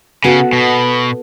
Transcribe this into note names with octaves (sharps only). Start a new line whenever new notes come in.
C#3 B3 F#4 A4
B2